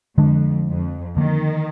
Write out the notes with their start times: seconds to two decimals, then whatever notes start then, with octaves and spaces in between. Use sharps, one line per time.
0.18 F2 D3 G#3 D4
0.67 F2
1.17 D3 D#3 F3 A#3